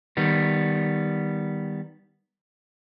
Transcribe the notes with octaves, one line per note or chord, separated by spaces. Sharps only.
D#3 G3 B3